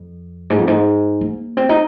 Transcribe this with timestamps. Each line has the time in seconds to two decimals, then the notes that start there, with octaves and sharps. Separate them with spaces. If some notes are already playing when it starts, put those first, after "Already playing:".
Already playing: F2
0.50 G#2
0.58 F2
0.68 G#2
1.21 A#3
1.57 C4
1.69 D#4